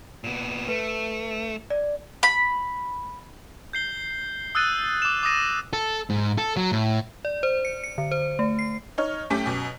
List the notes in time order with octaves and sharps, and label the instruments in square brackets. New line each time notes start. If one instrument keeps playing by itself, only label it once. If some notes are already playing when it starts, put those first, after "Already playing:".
[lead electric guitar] A#2 B3
[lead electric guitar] A3 [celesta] B4
[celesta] D5
[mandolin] B5
[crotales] G6 C7 G7
D#6 E6 F#6 A6 D#7
D6 E7
D6 D#6 A#6 D#7
[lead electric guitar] A4
G#2
A4
F#3
A2
[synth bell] D5
C5
C#7
C#7
D3
C5
A3
C7
[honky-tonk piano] D#4 C#5 F6
F#2 A3 C#4 G4 G5 D6
F#2 B2